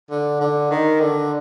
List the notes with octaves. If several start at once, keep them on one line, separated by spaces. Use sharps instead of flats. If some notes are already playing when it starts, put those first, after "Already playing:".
D3
D3
D#3
D3